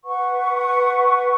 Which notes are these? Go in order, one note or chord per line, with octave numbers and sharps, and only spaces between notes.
B4 F#5 C#6